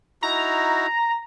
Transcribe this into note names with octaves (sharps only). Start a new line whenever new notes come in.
D#4 E4 F#4 A#5